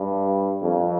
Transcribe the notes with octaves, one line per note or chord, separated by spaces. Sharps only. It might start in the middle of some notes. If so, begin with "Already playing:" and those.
Already playing: G2
F2